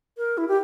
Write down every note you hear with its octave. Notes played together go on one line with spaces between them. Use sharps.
A#4
E4
G4